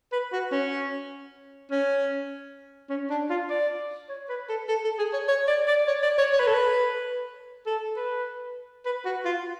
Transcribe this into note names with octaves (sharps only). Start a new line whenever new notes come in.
B4
F#4
C#4
C#4
C#4
D4
F4
D5
C#5
B4
A4
A4
A4
G#4
C#5
C#5
D5
D5
C#5
D5
C#5
C#5
B4
A4
B4
A4
B4
B4
F#4
F4